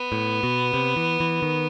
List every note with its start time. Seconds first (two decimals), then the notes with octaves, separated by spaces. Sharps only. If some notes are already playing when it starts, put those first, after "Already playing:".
Already playing: B3
0.12 A2
0.43 B2
0.74 C3
0.96 E3
1.20 E3
1.42 D#3